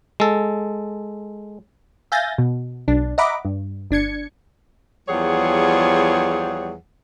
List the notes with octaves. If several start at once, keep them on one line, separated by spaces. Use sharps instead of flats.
G#3 A4
E5 F5 G#5 G6 A6 A#6
B2
B1 D4
D#5 E5 F#5 A#5 B5 D6
G2
G1 D4 G#6 C#7
E2 F3 G3 G#4 C#5 F#5